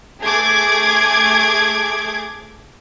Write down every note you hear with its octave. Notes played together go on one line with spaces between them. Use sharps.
A3 G#4 D6 G#6